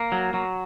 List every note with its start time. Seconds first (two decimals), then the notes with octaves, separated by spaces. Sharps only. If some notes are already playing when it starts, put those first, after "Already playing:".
Already playing: A#3
0.12 F#3
0.34 F#3